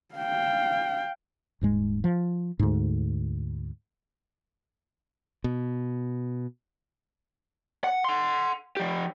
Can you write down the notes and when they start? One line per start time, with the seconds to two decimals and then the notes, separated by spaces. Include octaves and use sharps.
0.15 F5 G5
1.61 D#1 G#2 G#3
2.04 F3
2.59 D2 G#2
5.44 B2
7.84 F#5
8.04 F#5 C6
8.77 F3 G4